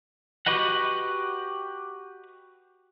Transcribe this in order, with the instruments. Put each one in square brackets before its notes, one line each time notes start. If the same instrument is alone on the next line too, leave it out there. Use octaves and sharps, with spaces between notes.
[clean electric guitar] F#4 G4 B4 D#5 F#5